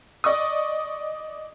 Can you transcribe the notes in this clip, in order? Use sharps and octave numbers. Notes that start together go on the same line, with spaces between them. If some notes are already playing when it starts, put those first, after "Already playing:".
D5 D#5 C#6 D#6